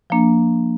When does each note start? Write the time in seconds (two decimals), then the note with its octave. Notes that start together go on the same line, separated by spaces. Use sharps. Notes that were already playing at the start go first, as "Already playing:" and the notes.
0.10 F3 A#3 D4